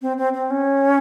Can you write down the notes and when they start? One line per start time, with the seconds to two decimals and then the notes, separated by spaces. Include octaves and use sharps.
0.02 C4
0.17 C4
0.33 C4
0.50 C#4